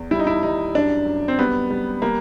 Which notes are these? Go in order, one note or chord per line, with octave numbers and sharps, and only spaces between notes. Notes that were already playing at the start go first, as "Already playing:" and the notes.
Already playing: E2
G3 E4
D#4
E4
G3 D#4
F#2 D4
F#2
C4
G3 B3
G3
G3 A#3